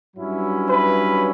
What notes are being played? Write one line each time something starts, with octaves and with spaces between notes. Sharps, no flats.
G2 F#3 C#4 E4
B4